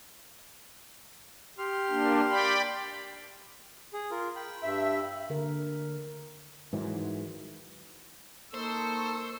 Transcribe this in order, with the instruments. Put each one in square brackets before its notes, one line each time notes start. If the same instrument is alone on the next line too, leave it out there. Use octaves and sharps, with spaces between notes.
[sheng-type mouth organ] G4 C6 F6
[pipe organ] A#3 D4
D5 G5 B5
[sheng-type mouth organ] G#4
F4 A#4
G5 B5
[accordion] G2 E5
[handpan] D3 A#4
[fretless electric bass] G#2 D#3 E3 F#3
[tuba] A#3 [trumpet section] D#4 A4 [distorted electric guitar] C5 [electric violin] C#6 E6